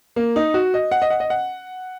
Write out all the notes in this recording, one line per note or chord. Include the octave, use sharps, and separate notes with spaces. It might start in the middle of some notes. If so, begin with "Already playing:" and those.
A#3
D#4
F#4
D#5
F#5
D#5
F#5
D#5
F#5